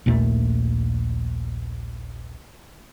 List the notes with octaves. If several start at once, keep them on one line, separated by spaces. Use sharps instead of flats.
A#1 D#2 A#2 A3